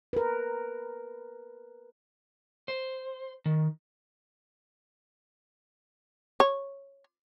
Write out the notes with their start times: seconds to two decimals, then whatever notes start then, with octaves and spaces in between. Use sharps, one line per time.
0.13 A#4 B4
2.68 C5
3.46 D#3
6.40 C#5